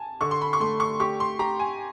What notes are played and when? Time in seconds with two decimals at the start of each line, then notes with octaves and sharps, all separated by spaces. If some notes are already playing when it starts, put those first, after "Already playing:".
Already playing: G#5 A5
0.21 D3 C#6
0.31 C6
0.41 B5
0.53 C#6
0.60 A3 C6
0.80 C#6
1.00 G4 C#6
1.20 C6
1.39 G4 A#5
1.59 G#5